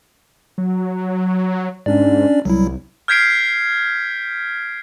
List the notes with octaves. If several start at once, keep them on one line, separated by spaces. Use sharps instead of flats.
F#3
G#2 C#4 D4 D5
C2 F#3 G3 E4
F6 G6 G#6 B6 C7 D7